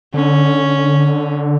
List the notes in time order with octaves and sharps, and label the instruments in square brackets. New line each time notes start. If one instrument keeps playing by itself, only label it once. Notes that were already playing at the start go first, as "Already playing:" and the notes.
[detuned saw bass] D3 [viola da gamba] C#4